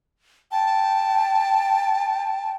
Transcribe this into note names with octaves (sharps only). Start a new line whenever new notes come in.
G5 A5